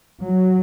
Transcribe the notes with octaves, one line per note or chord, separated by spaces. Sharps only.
F#3